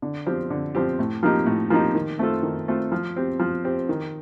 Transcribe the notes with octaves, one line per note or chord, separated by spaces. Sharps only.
D3
F3 C4 G4
D3
F3 C4 G4
A2
F3 A#3 D#4 G4
A2
F3 A#3 D#4 G4
D#3
A3 C4 F4 A4
D#3
A3 C4 F4 A4
F3
C4 G4
F3
C4 G4
D#3